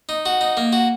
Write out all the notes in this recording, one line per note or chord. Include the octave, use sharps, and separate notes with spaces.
D#4
F#4
D#4
A#3
F#4